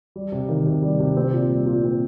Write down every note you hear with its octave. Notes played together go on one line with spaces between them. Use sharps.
G3
C3
D#3
C3
G3
C3
C4
A#2
G3
A#2
C4